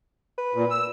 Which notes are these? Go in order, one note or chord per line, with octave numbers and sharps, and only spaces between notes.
B4
A#2
E6